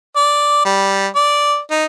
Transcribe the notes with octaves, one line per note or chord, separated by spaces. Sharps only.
D5
G3
D5
D#4